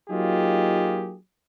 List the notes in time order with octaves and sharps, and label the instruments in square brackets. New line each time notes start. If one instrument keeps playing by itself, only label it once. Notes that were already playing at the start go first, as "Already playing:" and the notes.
[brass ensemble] F#3 A#3 D#4 F4 G4 G#4